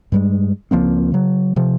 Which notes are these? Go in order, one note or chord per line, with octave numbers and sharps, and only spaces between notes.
G2 G3 G#3
C#2 F3 A#3 C4
C#3 F#3
C3 F3